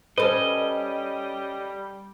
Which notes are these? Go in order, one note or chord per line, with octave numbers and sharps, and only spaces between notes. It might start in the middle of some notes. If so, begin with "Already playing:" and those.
G3 C#4 A4 B4 C5 D#5